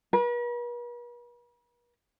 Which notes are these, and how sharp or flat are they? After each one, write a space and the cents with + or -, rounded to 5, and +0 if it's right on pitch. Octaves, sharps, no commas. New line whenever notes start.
B4 -45 B5 -40